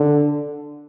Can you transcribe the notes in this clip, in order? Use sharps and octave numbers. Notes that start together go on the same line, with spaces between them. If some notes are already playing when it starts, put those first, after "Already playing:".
Already playing: D3